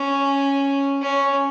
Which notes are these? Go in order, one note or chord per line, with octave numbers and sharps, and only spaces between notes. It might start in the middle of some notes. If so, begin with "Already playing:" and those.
Already playing: C#4
C#4